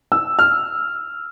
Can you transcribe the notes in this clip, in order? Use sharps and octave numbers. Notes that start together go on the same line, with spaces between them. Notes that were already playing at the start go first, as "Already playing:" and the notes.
E6
F6